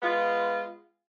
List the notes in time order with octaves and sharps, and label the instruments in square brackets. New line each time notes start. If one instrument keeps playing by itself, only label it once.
[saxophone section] G#3 B3 F4